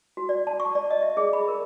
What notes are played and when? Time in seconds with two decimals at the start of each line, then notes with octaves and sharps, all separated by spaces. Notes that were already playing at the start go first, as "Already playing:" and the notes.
0.17 F#4
0.29 D5
0.47 A5
0.60 C#6
0.75 D5
0.90 D#5
1.02 E5
1.17 G#4
1.33 B5
1.48 A#4